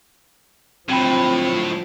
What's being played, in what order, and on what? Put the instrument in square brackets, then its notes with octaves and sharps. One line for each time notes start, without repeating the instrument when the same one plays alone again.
[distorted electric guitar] A2 [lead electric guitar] D3 F#3 [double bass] F3 [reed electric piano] C4 G5 B5